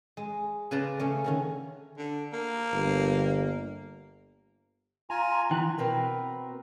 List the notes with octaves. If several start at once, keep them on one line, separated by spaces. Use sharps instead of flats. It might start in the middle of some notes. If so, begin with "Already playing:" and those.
G#3
C#3 B4 D5 A5 A#5 C6
C#3 A3 C#4
D3 D#3 C#4
D3
A#3
G1
F4 G#5 A#5
E3 G5 A#5 F#6
B2 C4 A#4 B4